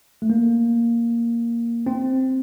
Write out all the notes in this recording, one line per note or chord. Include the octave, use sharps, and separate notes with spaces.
A3
A#3
C4